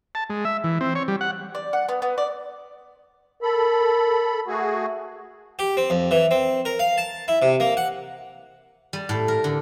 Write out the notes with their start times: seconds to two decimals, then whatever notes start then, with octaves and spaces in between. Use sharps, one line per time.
0.15 A5
0.30 G#3
0.45 E5
0.64 E3
0.81 C4
0.95 C#5
1.08 G3
1.21 F#5
1.55 D5
1.73 F#5
1.89 B3
2.02 B3
2.18 D5
3.42 A4 A#4 B5
4.47 A3 F#4 G#4
5.59 G4
5.77 C4
5.90 F2
6.11 E3
6.31 C4
6.65 A#4
6.79 F5
6.98 A5
7.28 E4
7.42 C3
7.60 A#3
7.77 F#5
8.93 G3
9.09 A2
9.28 A#4
9.44 D3